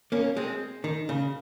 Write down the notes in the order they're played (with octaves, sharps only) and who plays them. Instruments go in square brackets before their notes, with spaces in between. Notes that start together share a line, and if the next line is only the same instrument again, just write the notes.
[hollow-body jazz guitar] A#3 C#4
G#3 C4
D#3
C#3